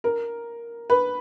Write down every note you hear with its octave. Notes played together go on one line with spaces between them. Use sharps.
A#4
B4